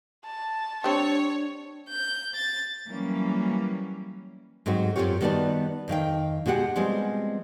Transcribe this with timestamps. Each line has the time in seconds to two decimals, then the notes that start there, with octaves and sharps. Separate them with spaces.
0.25 A5
0.84 G3 C4 D4 C#5
1.89 G6
2.35 A6
2.88 E3 F#3 G3 A#3 C#4
4.66 G#2 F#3 G#3 A3 C4 F#4
4.96 F#2 B2 C4 F4 G4 C#5
5.21 D#3 G3 B3 F#4 D5 A5
5.88 F2 D#3 F5 G5
6.46 B2 G#3 F#4 G4 F#5
6.76 F3 G3 G#3 B3 C4